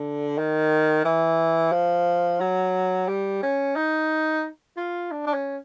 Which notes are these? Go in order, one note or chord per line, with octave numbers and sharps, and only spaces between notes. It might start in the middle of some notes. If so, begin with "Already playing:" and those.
Already playing: D3
D#3
E3
F3
F#3
G3
C#4
D#4
F4
D4
D4
C#4